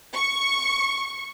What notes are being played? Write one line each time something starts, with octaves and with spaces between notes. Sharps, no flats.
C#6